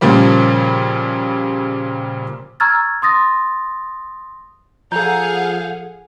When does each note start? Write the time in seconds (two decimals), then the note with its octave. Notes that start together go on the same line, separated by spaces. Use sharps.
0.01 A#2 C#3 F3 G3 A#3
2.60 A#5 C#6 E6 F6 G#6 A6
3.02 C6 D#6 A6 A#6
4.92 F3 G#4 A4 F5 F#5 A#5 G6